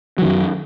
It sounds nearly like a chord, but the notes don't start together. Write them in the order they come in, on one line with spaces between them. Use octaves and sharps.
F#3 D#3 F#2